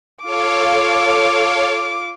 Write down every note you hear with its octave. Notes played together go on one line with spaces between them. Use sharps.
F4 A4 C#5 F5 D6